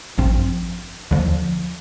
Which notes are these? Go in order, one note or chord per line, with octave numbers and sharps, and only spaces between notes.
A1 G2 F3 C4
D#2 D3 F3